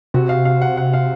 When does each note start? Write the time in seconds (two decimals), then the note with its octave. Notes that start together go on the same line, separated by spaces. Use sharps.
0.14 C3 F#4
0.29 F5
0.45 F5
0.62 F#5
0.77 F#5
0.93 F5